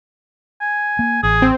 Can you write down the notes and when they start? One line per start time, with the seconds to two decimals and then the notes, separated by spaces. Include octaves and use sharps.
0.61 G#5
0.99 A#3
1.23 A1 G#4
1.42 C4